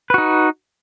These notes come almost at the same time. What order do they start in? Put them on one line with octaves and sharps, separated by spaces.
B4 F#4 D#4